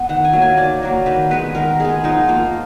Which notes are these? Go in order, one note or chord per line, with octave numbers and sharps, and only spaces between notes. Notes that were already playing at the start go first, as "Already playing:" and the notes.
Already playing: B3
D#3 F#5
G#5
F#3 A#3
G#5
D#3 D5
F#3 A#3
D#3 B4
G#3 B3 B4
D#3 A#4
G#3 B3 G#4
F3 D#4
A#3 F4